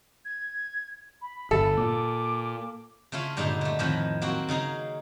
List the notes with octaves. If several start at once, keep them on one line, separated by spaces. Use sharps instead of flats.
G#6
B5
G1 A4
A#2 D6
C#3 A3 C#4 E4 F4
G2 A#2 D3 G#3 D#4
D3 A3
F2 A2 D#3 F3
F#3 A#3 C4 F#4
C#3 D#4 G#4 A#5